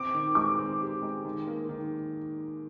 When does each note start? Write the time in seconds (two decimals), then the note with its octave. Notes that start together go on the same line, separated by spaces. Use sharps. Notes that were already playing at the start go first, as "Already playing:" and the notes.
Already playing: C4 D6
0.14 D#3
0.35 G#3 D6
0.59 C4
0.81 G4
1.02 G#3
1.25 D#3
1.47 A#3
1.69 D#3